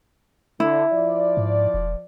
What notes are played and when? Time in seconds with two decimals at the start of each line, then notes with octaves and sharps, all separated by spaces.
0.60 D3 E4
0.92 F3 D5
1.37 G#2
1.74 E1